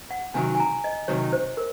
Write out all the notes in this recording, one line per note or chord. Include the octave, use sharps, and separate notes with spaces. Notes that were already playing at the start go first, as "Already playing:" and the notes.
F#5
C3 D#3 F#3 G#5
G#5
A#5
D#5
C3 D#3 F#3 C#5
C5
A#4